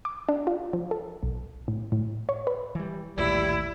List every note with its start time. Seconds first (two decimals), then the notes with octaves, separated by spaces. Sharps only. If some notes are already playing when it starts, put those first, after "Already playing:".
0.05 D6
0.29 D4
0.47 F4
0.73 F3
0.91 A4
1.23 B1
1.68 A2
1.92 A2
2.29 C#5
2.47 B4
2.75 E3 G3
3.17 A#1 D#2 A2 G3 E4